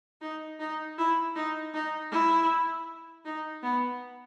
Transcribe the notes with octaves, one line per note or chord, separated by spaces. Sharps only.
D#4
D#4
E4
D#4
D#4
E4
D#4
B3